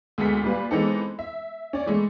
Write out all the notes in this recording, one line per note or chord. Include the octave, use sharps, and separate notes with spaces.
D2 G#3 B3 A4 B6
A#2 G3 F4 B4
E3 G#3 B3 C4 D#4 A4
E5
C#4 D5
E3 G#3 A3